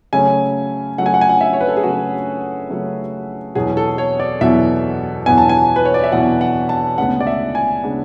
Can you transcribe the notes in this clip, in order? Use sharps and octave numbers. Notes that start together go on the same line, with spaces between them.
C#3 F#3 A3 C#4 G#5
C#3 F#3 A3 C#4 F#5
G#5
F#5
G#5
F#5
E5
C#5
B4
A4
G#4
C#3 F#3 A3 C#4 F#4
C#3 F#3 A3 C#4
E2 B2 F#3 B3 G#4
A4
C#5
D5
E2 B2 F#3 B3 E5
E2 B2 F#3 B3 G#5
A5
G#5
B4
C#5
D5
E5
E2 B2 F#3 B3 F#5
F#5
A5
D2 C#3 G#3 B3 D4 F#5
D5
E5
G#5
C#3 G#3 B3 D4